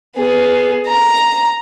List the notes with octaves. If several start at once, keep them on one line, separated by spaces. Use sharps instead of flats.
B3 G#4
A#5